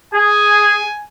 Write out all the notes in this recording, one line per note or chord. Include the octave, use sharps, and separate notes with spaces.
G#4 G#5